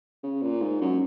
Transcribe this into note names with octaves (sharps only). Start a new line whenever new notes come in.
C#3
A#2
G#2
F#2